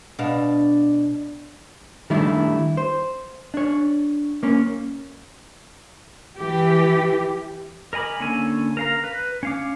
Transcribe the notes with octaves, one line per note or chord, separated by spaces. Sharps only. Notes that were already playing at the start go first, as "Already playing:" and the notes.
B2 D4 F5
D#3 G3 A3 D4 E4
C5
D4 C#5
A#3 C#4
E3 G4
A#4 D#5 G#5 B5 D6
D3 A#3 C#4 A4 G#5
A#4 F5 A#5
B4
C#4 F5 D6